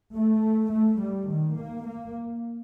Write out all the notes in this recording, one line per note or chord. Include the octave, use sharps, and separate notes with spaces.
A3
A3
G3
D#3
A#3
A#3